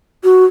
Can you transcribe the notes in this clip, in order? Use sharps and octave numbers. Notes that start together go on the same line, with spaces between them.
F#4